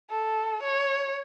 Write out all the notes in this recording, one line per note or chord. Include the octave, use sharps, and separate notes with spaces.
A4
C#5